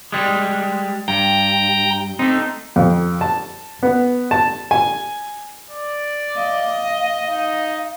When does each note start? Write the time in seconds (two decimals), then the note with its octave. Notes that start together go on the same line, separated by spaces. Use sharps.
0.12 G3 G#3
1.08 G2 G5 A#5
2.19 A3 C4 D#4
2.76 F2
3.21 A5
3.83 B3
4.31 A5
4.71 G#5
5.71 D5
6.36 D#5 F5
7.27 D#4 F5